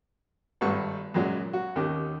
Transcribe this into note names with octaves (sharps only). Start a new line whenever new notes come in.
G#1 G2 A3 F#5 C#6
F#2 A#2 F#3 G#3
F#4
D#2 D#3 C#4 G4 D6